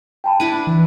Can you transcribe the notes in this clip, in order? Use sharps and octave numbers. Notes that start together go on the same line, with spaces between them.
G5 A5 B5
D4 E4 B4 D#7
E3